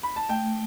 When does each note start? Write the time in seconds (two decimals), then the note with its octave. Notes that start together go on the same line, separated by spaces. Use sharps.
0.03 B5
0.16 A5
0.29 A3 G5